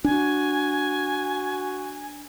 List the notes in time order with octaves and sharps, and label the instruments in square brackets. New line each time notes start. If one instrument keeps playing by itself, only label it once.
[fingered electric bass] D4 [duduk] F#4 [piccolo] G#5